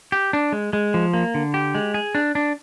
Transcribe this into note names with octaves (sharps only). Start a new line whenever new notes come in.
G4
D4
G#3
G#3
F3
A#3
D3
G4
G#3
G#4
D4
D4